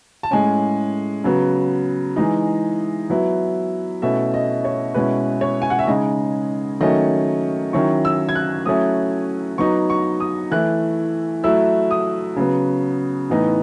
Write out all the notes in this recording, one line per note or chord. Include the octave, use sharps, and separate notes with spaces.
A5
A2 G#3 C#4 G#5
C#3 F#3 B3
E3 G#3 D#4
F#3 B3 E4
B2 A3 C#4 E4 E5
D#5
C#5
B2 G#3 C#4 E4 B4
C#5
G#5
F#5
E5
C#3 G#3 D#4 D#5
D#3 F#3 A3 C#4 D#5
D#3 F#3 C#4 E4 C#6
E6
G#6
F#6
F#3 A3 C#4 E4 D#6
F#3 B3 D#4 C#6
C#6
D#6
E3 A3 E4 F#6
F#3 A3 E4 E6
D#6
C#3 F#3 B3
A2 E3 B3 D#4